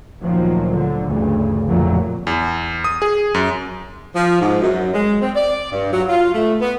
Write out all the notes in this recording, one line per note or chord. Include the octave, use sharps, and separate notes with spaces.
D2 A#2 D#3 F3 F#3
D3 F#3
D2 G2 C#3 E3
A1 F2 A#2 D3 F#3 A3
E2
D#6
G#4
F#2
F3
G#2
F#2
G#3
C4
D5
G2
F#3
F4
A3
B3